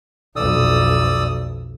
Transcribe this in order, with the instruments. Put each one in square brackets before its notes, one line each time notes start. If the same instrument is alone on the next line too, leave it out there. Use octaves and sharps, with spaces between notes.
[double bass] B1 F2 [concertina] D5 D#6 E6